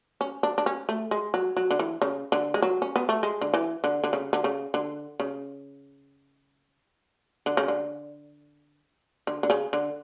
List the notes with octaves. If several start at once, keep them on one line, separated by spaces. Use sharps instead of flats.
C#4
D4
D4
C#4
A3
G#3
F#3
F#3
D3
E3
C#3
D3
G#3
F#3
C#4
B3
A3
G#3
D3
E3
D3
D3
C#3
D3
C#3
D3
C#3
D3
C#3
D3
D3
D3
C#3
D3